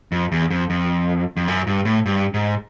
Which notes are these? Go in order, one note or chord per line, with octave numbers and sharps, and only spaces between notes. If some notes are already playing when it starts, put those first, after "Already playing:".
F2
E2
F2
F2
F2
F#2
G2
A2
G2
G#2